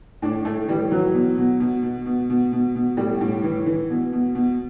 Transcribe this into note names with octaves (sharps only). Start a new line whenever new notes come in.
A2 D4
A2 A3
E3 G3
E3 F#3
B2
B2
B2
B2
B2
B2
B2
B2
A2 G3
A2
E3
E3
B2
B2
B2